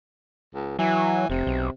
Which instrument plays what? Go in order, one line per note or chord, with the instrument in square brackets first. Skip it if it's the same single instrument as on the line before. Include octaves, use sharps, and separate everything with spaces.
[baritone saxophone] C#2
[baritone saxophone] E3 [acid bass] F#3
[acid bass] F1 [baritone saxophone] C3
[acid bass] B1